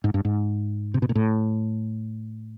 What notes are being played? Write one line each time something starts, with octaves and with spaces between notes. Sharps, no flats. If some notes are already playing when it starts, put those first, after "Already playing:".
G#2
G2
G#2
C3
B2
A#2
A2